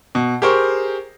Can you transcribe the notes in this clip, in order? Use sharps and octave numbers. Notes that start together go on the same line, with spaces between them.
B2
G4 G#4 A#4 C5 C#6